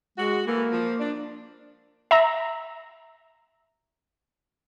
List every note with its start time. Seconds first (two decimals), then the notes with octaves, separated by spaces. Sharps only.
0.18 G#3 F#4
0.47 E3 A#3 A4 A#4
0.71 F3
1.00 D4
2.11 E5 A#5